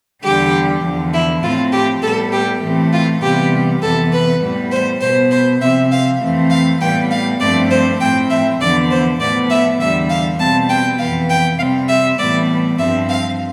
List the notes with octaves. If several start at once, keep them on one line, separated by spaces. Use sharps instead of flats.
E2 D3 G3 G4
E2 D3 F3
E4
A2 F3 C4 F4
G4
A2 G3 B3 A4
G4
A2 E3 A3 C4
F4
C3 E3 G3 B3 G4
F2 C3 E3 B3 A4
B4
A2 G3 B3
C5
B2 B3 C5
C5
C3 F3 C4 E5
F5
F2 E3 A3 C4
F5
A2 G3 B3 G5
F5
G2 F3 A3 C4 D5
C5
A2 F3 C4 G5
E5
E2 D3 F3 B3 D5
C5
A2 F3 B3 D5
E5
E2 D3 G3 E5
F5
B2 G3 C4 A5
G5
F2 E3 B3 F5
G5
C3 G3 C4 F5
E5
A2 E3 G3 B3 D5
G2 F3 C4 E5
F5